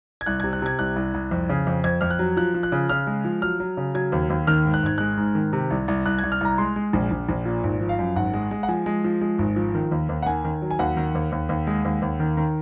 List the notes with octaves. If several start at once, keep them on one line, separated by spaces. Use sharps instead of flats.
G#6
C2 F#6
C3 G#6
F#6
C3 G#6
C2 F#6
C2
C2
F2
C#3
F2
F2 G#6
F2 F6
F#6
F#3
F3 F#6
F3
F#6
C#3
C#3 F6
G#3
F3
F#3 F6
F#3
C#3
F#3 G#6
D#2
D#2
D#3 F6
G#2
F#6
G#1 G#6
G#3 F#6
G#2
D#3
C3
C2
C2
C2 F#6
C2 G#6
F6
C2 A#5
G#3 C6
G#3
A#1
A#1
A#1
A#2
G#1
F3
F5
F#2
G#1 F#5
G#3
G#3
F#5
F3 G#5
G#3
F3
G#3
G#1
F3
D#3
D#2
D#2
F#5
D#3 G#5
D#3
F#3
G#5
D#2 F#5
D#3
D#2
D#2
D#2
G#3
D#2
D#2
D#3
D#3